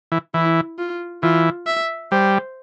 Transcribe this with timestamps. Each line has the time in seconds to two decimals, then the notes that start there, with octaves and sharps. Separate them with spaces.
0.12 E3
0.34 E3 E4
0.79 F4
1.23 E3 F4
1.67 E5
2.12 G3 C5